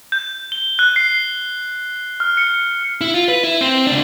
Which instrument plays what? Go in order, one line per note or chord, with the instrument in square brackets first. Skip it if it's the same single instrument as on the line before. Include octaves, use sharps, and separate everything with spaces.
[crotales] G6
G7
F#6
C7
F6
C#7
[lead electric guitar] E4
F4
B4
E4
C4 C5
C#2 D4